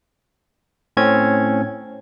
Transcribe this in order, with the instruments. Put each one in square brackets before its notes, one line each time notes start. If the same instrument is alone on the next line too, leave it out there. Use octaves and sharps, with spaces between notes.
[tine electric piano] A2 C4 C#4 G#6